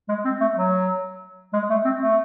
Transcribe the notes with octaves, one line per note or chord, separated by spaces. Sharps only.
G#3
C4
A3
F#3
G#3
A3
C4
A3